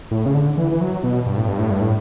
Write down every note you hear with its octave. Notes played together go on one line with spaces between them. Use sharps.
A2
C#3
D3
E3
E3
F#3
B2
G2
A2
G2
A2
G2
A2